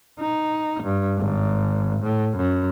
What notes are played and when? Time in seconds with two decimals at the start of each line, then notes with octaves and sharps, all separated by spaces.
0.20 D#4
0.83 G2
1.18 G#1
2.03 A2
2.37 F#2